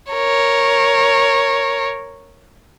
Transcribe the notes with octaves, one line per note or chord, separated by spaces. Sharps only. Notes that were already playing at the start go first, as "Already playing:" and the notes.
A#4 C#5